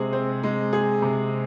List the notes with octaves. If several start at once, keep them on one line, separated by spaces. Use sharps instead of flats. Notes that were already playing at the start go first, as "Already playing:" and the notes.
Already playing: C3 G#3 C4 G#4
C4
G#3
G#4
C3